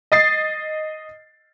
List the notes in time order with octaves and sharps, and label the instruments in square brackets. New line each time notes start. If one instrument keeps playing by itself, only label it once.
[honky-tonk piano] D#5 D#6 A6 C7